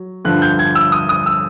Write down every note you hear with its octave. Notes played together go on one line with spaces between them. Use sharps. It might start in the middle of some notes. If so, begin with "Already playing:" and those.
Already playing: F#3
G2 D3 F3 F#6
G6
G#6
E6
D#6
D#6
E6